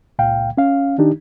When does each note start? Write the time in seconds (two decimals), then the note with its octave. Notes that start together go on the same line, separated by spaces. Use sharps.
0.19 C#2 A#2 F5 G5
0.57 C#4 F5
0.98 D#3 D4 D#4 G4